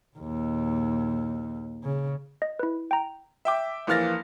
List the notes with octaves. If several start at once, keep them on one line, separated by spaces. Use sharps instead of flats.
A#1 D#2
C#3
D#5
E4 B4
G5 A#5
E5 G5 D6
A#1 E3 A#3 F6 A6 A#6